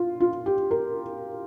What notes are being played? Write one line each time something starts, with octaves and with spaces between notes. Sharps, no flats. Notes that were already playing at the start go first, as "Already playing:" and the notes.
Already playing: F4
F4
G4
A#4